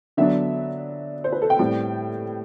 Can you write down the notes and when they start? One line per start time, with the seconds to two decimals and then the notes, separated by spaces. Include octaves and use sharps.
0.17 D3 F#3 B3 D4 E5
1.24 C5
1.32 B4
1.42 A4
1.50 G5
1.59 A2 G3 C4